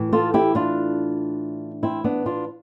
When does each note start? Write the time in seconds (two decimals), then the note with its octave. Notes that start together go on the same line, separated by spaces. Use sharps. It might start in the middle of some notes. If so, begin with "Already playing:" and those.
Already playing: A2 E3
0.13 F4 A4
0.34 E4 G4
0.55 D4 F4
1.83 C4 E4
2.04 B3 D4
2.26 D4 F4